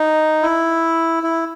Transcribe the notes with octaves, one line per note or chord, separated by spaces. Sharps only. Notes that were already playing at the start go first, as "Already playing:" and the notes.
Already playing: D#4
E4
E4